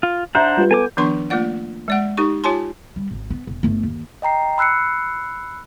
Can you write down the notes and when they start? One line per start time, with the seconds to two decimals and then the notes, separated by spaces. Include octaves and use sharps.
0.03 F4
0.35 D4 C5 E5 F#5 A#5 G6
0.57 G3 F4 B4
0.71 B3 A4 G#5 A5 D6
0.97 D#3 F3 B3 D4 C6 C#6
1.30 A3 A#3 F4 D5 F#5
1.88 G#3 D5 F#5
2.17 D#4 G4 C#6
2.44 F4 G4 C#5 G#5 A5 C6
2.96 G3
3.11 G#1
3.30 B3
3.47 E1
3.63 G1 A3
3.83 D#2
4.22 D#5 G5 A#5 C7
4.58 B5 E6 F#6 C7 C#7